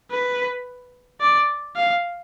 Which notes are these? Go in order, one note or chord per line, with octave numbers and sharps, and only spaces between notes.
B4
D5
F5